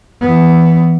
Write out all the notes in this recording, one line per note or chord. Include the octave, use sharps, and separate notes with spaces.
E3 B3